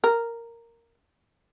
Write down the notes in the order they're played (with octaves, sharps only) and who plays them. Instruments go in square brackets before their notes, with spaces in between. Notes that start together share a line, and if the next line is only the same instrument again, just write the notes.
[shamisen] A#4